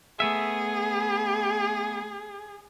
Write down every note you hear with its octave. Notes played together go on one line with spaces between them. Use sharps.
A3 B3 G#4 E5